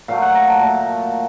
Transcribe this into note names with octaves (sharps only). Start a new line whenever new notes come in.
A#2 F#3 A3 F5
F#5
A#5
A5
A#2 A3 A5